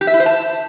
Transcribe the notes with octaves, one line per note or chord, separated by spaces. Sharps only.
G4
E5
E4
C5
A5